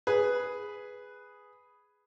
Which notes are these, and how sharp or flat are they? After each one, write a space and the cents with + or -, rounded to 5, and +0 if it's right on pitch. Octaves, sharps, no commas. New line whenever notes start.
G#4 +0 B4 +5